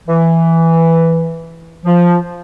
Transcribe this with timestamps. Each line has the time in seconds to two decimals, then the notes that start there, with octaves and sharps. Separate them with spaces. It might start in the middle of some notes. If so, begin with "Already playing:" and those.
0.07 E3
1.85 F3